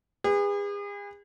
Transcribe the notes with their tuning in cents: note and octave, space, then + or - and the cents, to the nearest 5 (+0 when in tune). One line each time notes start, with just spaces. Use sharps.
G#4 -40 B4 +0